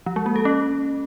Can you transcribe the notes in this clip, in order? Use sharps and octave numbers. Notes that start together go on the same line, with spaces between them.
F3
G#3
A#3
A4
C#4